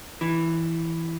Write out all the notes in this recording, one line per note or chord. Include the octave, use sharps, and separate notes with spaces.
E3